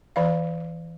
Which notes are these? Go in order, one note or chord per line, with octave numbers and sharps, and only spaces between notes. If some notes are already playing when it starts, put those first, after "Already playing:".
E3 D5 F5